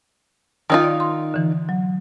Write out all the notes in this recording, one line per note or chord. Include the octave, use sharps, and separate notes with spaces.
D#3 D#4 F4 G5 E6
D5
C6
D3 E3
F#3